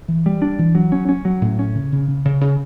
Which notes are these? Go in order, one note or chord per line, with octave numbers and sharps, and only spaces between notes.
E3
G3
D4
E3
F#3
C#4
C#4
F#3
A2
C#4
C#3
C#3
C#3
C#3
C#3